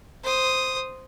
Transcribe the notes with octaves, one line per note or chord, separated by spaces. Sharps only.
C5 D#6